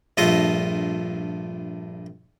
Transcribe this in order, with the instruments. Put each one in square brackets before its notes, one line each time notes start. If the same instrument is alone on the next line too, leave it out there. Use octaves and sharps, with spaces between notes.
[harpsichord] A#1 G2 A3 F4 D#5